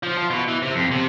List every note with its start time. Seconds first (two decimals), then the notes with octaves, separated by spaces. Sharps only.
0.03 F3
0.18 F3
0.30 B2
0.48 E3
0.62 C3
0.75 F2
0.91 C3